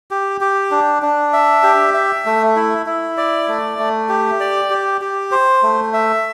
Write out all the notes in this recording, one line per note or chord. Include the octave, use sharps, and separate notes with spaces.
G4
G4
D4
D4
E5
G4
E5
A3
E4
E4
D5
A3
A3
G4
D5
G4
G4
C5
A3
E5